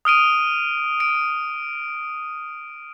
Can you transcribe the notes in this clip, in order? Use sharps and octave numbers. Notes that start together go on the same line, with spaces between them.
D#6 F6 D7 D#7
D7